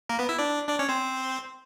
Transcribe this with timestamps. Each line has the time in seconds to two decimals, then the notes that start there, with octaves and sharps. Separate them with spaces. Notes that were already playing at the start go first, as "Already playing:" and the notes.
0.09 A#3 A#4
0.19 B3 B4
0.29 E4 E5
0.38 D4 D5
0.68 D4 D5
0.79 C#4 C#5
0.89 C4 C5